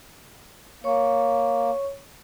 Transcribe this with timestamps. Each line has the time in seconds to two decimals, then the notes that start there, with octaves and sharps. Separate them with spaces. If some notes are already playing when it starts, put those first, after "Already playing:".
0.84 A#3 C#5 C#6